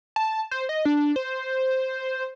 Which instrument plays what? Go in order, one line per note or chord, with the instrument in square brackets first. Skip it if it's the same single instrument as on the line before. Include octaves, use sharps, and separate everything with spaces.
[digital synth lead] A5
C5
D#5
D4
C5